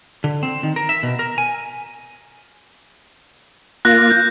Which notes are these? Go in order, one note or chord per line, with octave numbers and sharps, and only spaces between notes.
D3
C4
D#3
A#4
E5
B2
A#4
G#5
A#3 F4 F#6 A#6
G6